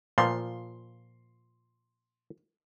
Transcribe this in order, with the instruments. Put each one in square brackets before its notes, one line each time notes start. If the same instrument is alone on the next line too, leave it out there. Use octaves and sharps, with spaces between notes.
[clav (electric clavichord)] A#2 F3 [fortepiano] C6